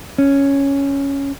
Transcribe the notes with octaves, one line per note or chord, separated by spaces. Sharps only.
C#4